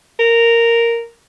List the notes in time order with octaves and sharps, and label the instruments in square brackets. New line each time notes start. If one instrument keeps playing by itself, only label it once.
[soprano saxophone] A#4